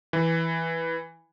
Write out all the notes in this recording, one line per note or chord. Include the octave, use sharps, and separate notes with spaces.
E3